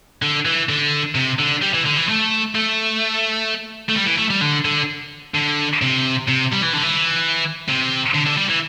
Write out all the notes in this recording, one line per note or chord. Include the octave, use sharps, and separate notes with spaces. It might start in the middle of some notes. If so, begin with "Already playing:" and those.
D3
E3
D3
C3
D3
G3
E3
D3
E3
A3
A3
A3
G3
E3
A3
G3
D3
D3
D3
C3
C3
G3
E3
D3
E3
C3
D3
D3
G3
E3